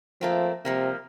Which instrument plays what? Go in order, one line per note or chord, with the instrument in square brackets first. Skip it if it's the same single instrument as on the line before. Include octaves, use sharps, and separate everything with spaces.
[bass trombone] F3 [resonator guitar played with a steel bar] A3 A#3 C4
[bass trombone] C3 [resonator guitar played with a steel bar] F3 G3 A#3